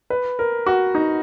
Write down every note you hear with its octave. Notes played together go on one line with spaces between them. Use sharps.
B4
A#4
F#4
D#4